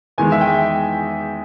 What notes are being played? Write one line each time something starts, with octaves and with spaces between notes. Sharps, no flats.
E2 D#3 G#3 G#5
E5
G5